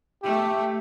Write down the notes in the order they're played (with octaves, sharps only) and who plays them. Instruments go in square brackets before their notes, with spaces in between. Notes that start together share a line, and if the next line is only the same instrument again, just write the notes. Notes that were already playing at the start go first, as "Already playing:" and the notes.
[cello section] A3 [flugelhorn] G4